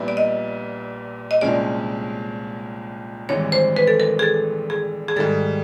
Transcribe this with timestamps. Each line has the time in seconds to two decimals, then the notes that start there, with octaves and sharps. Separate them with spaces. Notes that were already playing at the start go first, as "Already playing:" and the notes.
Already playing: A#1 A#2 G3 B3 E4
0.08 D5
0.17 D#5
1.31 D#5
1.41 C2 A#2 F3 G#3 C#4 D5
3.29 G#1 G2 E3 G#3 C#5
3.52 C5
3.76 B4
3.87 A4
4.00 A#4
4.19 G#4
4.23 A4
4.70 G#4
5.08 G#4
5.16 G#2 D#3 G3 A4